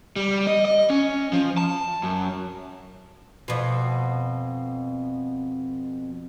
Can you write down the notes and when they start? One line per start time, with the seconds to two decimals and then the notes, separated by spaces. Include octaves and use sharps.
0.16 G3
0.47 D#5
0.65 D#5
0.90 C#4
1.33 F3
1.57 A5
2.03 F#2
3.48 F2 B2